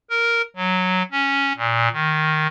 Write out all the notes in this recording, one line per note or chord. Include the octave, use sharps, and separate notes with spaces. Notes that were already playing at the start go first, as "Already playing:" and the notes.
A#4
F#3
C#4
A#2
D#3